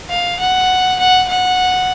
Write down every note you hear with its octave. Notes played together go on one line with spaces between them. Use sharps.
F5
F#5
F#5
F#5